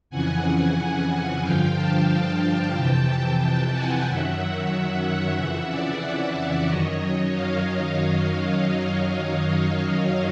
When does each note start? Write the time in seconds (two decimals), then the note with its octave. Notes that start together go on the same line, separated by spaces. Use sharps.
0.10 F2 C#3 E3 F#5 G#5
1.09 F#5 G#5
1.41 G2 D3 F3 F5 G5
1.74 G5 A5
2.07 G5 A5
2.73 F2 C3 E3 G5 A5
3.06 G5 A5
3.39 G5 A5
3.71 F#5 G#5
4.04 F#2 D#3 F#3 E5 F#5
4.38 E5 F#5
4.70 E5 F#5
5.02 E5 F#5
5.36 F2 C#3 E3 E5 F#5
5.68 D5 E5
6.67 F#2 D#3 F#3 C#5 D#5
7.00 C#5 D#5
7.33 D#5 F5